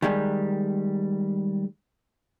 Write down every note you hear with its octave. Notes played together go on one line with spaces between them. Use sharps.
D#3 G3 G#3